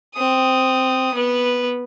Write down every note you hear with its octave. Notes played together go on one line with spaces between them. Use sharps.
C4 D#6
B3 B4